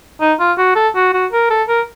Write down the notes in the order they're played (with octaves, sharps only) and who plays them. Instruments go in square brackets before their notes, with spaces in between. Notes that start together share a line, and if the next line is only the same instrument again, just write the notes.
[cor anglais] D#4
F4
F#4
A4
F#4
F#4
A#4
A4
A#4